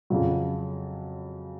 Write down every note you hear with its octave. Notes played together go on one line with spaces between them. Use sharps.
F2 C#3 F#3